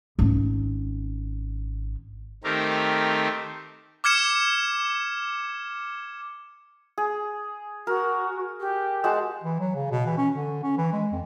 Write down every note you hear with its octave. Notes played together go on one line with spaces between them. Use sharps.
G#1 C#4
D#3 A3 C4 G4 A#4
D6 F6 G#6 C#7 E7
G#4
F#4 A#4
G4
G#3 F#4 A5
E3
F#3
C#3
B2
E3
C#4
D3
C#4
E3
G#3
F2